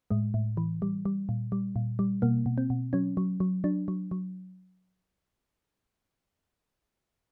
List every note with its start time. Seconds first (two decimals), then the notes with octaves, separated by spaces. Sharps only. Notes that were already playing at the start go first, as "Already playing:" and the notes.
0.11 A2 G#3
0.34 A2
0.57 E3
0.82 G3
1.05 G3
1.29 A#2
1.52 G3
1.76 A#2
1.99 G3
2.22 B2 A#3
2.46 B2
2.58 C4
2.70 B2
2.93 F#3 C#4
3.17 F#3
3.40 F#3
3.64 F#3 D4
3.88 F#3
4.11 F#3